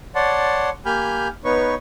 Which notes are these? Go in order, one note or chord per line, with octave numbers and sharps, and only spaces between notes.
C#5 D5 F#5 A5 C6
A#3 G4 G#5 B5 F6 G6
B3 D#4 B4 C#5 C#6